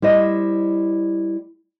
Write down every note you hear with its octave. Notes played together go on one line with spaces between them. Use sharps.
G3 E4 C5 D#5